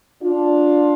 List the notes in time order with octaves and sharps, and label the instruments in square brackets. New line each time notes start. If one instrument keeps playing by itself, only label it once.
[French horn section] D4 F4